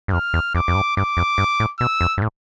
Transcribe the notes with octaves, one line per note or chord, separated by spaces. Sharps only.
G2
F2 F6
E2
F2 D6
F2
G2
G2 D6
F2
G2
A2
B2 E6
F2
G2
A2